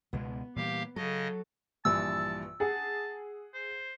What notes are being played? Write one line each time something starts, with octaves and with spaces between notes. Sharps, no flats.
C#2 B2 G#3 B3
A#2 E3 G3 G4 F5
C#3 F#3 A4 D#5
A#1 G2 E3 A5 E6
G#4 F#5 A5
C5